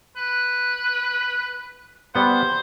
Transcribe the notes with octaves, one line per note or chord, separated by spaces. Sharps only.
B4
G3 B3 C5 F#5